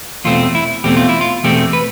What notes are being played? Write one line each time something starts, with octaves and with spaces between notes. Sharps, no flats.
E2 B2 A3 C4 F4
E4
E2 B2 A3 C4 G4
F4
E4
F4
E2 B2 A3 C4 G4
B4